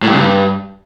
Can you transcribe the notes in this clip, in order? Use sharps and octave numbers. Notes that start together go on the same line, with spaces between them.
A2
G2
C#3
G2